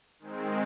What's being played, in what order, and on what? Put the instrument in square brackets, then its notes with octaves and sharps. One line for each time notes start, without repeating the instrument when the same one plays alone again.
[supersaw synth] D#3 G#3 C4